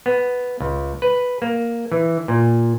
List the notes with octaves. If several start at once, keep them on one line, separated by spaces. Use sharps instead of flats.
B3
C#2
B4
A#3
E3
A#2